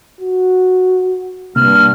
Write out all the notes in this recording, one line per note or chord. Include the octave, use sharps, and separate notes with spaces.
F#4
G2 C3 A#3 F6